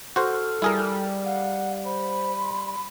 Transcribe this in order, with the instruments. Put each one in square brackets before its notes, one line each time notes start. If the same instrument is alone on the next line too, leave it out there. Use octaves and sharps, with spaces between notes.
[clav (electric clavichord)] F#4 C5 [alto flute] A4 [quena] F6
[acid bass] G3 [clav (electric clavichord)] E4 G#4 A#4
[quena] F5 [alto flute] F#5
[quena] F5
[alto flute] C5 [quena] B5
[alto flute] C6